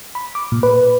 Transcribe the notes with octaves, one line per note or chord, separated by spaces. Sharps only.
B5
D6
A#2
B4